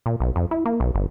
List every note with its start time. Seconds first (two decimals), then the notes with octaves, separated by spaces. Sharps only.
0.06 A#2
0.20 B1
0.36 F2
0.51 E4
0.66 A#3
0.80 B1
0.95 G1